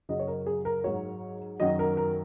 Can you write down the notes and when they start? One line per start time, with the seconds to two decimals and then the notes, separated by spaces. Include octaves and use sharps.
0.09 F#2 C#3 F#3 D#5
0.19 C#5
0.27 A#4
0.46 G#4
0.65 A#4
0.84 G#2 F#3 C#5
1.60 F#2 D#3 F#3 D#5
1.79 A#4
1.97 A#4